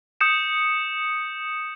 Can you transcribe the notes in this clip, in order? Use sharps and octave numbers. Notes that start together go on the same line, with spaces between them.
D#6 G6 C#7 E7